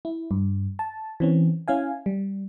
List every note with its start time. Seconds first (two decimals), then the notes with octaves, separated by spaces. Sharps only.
0.05 E4
0.31 G2
0.79 A5
1.20 E3 C4 C#4
1.68 C#4 E4 F5 G#5
2.06 G3